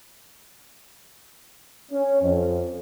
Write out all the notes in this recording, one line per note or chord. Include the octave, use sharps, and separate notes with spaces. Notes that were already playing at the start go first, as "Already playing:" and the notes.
C#4
F2